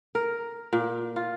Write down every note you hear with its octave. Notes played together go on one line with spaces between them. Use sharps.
A#4
A#2
F4